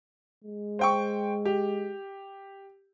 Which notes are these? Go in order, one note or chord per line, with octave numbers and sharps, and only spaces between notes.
G#3
C5 G5 C#6
G4